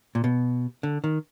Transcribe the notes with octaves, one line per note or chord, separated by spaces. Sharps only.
A#2
B2
D3
D#3